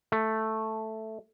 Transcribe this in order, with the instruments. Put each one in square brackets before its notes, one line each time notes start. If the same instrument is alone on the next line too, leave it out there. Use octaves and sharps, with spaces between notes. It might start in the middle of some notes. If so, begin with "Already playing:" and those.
[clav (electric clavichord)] A3